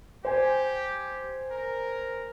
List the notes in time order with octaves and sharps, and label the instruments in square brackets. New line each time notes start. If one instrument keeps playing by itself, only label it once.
[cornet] G4 [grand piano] C5 G#5
[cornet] A#4